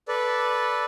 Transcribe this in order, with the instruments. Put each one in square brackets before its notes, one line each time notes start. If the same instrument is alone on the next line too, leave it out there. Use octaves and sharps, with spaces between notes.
[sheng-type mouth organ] A4 B4 D5